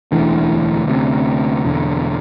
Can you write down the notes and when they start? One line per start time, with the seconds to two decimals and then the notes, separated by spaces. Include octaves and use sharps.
0.12 E1 D2 D3 E3
0.88 D2 C3
1.64 E1 E2 D3